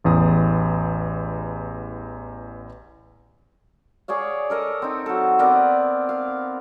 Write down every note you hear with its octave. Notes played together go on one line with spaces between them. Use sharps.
A1 E2 D#6
G#4 C#5 D5 F5
A4 A#4 D#5
C4 D#4
F#3 A4
B3 C4 A#4 D5
F5